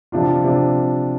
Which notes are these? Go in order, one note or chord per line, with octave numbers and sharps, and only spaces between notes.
C3 F3 D4 F4
C3 F3 D4